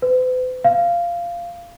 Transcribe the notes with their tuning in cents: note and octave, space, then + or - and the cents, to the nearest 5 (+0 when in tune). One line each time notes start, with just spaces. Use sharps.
B4 +45
F5 -15